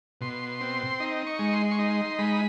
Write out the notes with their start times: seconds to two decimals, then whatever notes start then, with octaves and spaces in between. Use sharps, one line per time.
0.21 B2 C6
0.61 C4
1.00 D#4
1.27 C#6
1.39 G#3
1.53 C6
1.71 C#6
1.79 D#4 C6
2.18 G#3 B5